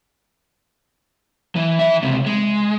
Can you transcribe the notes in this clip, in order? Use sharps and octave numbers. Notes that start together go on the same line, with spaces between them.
E3
E3 E5
C#2 C3
G#3